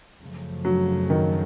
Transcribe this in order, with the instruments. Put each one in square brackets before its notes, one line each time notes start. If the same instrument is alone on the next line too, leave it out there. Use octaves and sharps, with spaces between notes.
[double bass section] F#2 C#3 F3 A3
[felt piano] F#3
D#3